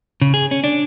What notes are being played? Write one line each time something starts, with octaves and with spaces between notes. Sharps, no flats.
C#3
G#4
C#4
D4